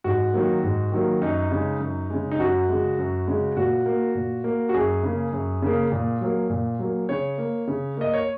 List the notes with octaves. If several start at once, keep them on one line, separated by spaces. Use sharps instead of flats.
G#2 F#4
D#3 F#3 A#3
G#2
D#3 F#3 A#3
F#2 D#4
C#3 G#3
F#2
C#3 G#3
D#4
F#2 F#4
C#3 G#3
F#2
C#3 G#3
A#2 F#4
A#3
A#2
A#3
F#4
F#2 G#4
C#3 A#3
F#2
C#3 A#3
A#2
F#3 A#3
A#2
F#3 A#3
C#3 C#5
A#3
C#3
A#3 D#5
C#5